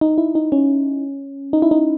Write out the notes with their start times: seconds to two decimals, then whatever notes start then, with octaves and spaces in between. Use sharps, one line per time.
0.01 D#4
0.18 E4
0.35 D#4
0.52 C#4
1.53 D#4
1.62 E4
1.71 D#4